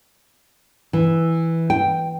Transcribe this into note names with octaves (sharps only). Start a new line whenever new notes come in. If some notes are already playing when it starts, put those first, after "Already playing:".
E3
G5